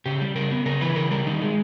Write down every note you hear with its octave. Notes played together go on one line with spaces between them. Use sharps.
C#3 G4
G3
C#3 A#4
B3
C#3 A#4
E3 B4
C#3 A#4
G3 A#4
D#3 D#4
G#3